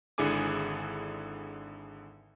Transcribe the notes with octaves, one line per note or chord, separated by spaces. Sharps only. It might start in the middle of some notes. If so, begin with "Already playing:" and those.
G#1 D3 E4 G#4 G#5 D6